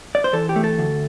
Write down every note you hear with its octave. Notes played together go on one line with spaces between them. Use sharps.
D5
C5
E3 A4
G4
A3
A4
D2